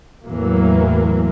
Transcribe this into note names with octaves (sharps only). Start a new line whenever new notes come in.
E2 A2 E3 F#3 A#3